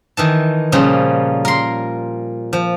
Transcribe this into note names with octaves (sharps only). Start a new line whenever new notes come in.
D#3 E3 A5
A#2 C#3 F3 G3
A#4 C6
F3